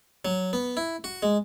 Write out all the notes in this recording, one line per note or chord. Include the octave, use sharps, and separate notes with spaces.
F#3
B3
E4
F#4
G#3